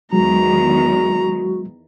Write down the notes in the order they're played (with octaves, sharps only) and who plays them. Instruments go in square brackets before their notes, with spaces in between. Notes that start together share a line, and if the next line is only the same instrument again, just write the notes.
[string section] E2 D#3 [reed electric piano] F#3 G#3 [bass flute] F#4 [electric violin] A#5